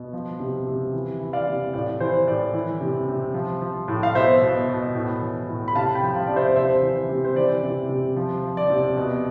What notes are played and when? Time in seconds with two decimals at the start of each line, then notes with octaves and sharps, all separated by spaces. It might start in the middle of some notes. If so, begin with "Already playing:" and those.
Already playing: B2
0.13 F3
0.40 C3
0.67 C3
0.93 E3
1.20 E3
1.33 D5 F5
1.47 C3
1.74 A2 D5
2.00 E3 C5
2.27 A2 D5
2.54 E3
2.81 C3
3.08 C3
3.34 F3
3.62 F3
3.88 A2
4.03 F5
4.15 B2 C5 E5
4.42 B2
4.68 B2
4.95 A2
5.21 E3
5.49 A2
5.68 B5
5.75 C3 F5 A5
5.95 G5 B5
6.03 F3
6.16 F5 A5
6.27 C3 D5
6.36 C5 E5
6.56 C3 C5 E5
6.82 E3
7.09 C3
7.25 C5
7.36 E3 D5
7.63 C3
7.89 C3
8.16 F3
8.43 F3
8.57 D5
8.70 C3
8.97 B2